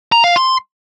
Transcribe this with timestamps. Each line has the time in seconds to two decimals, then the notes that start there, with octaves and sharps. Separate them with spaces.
0.12 A#5
0.24 F5
0.36 C6